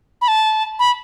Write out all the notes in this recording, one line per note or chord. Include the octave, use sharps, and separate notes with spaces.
B5
A5
B5